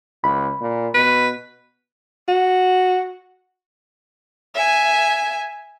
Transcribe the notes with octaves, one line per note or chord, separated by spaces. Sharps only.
C#2 B5
A#2
B2 B4
F#4
E5 G#5